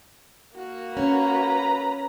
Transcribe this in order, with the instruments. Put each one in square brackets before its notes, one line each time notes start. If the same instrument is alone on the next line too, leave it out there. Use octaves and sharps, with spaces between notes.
[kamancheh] A#3 F#4
[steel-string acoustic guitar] C#4 [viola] B4 A#5